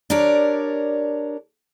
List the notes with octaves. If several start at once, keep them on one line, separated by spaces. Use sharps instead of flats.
D4 G4 A#4 C#5 D5